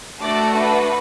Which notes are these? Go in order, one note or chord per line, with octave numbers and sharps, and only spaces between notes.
A3 D4 F#4 A4 D5
B4